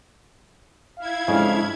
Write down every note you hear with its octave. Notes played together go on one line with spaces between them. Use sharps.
E4 F5 G#6
F2 G#2 C#3 G#3 D4